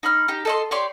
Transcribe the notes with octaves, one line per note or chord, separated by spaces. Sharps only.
D#4 B5 F6
D#4 G4
A4 D#5 C6
G4 C#5 D5 C6